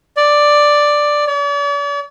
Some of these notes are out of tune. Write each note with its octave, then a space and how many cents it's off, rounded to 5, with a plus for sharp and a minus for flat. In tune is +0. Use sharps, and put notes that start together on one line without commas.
D5 +5
D5 -45